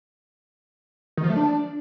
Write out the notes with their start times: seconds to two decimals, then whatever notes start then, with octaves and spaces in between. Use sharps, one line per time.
1.17 D#3
1.24 F3
1.30 A3
1.36 D4